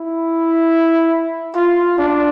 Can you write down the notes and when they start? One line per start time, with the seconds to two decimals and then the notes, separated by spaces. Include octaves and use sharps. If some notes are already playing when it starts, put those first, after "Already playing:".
Already playing: E4
1.56 F4
1.98 D4